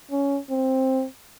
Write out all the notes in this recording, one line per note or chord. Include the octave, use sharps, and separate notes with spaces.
C#4
C4